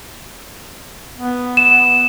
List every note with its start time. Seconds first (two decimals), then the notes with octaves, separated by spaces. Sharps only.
1.17 B3
1.57 E7